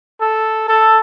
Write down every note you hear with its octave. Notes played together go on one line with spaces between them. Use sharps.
A4
A4